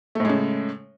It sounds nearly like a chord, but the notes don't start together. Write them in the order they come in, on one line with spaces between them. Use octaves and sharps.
A3 A2 G#3 C#3